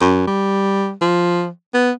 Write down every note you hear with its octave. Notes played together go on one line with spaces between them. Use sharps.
F#2
G3
F3
B3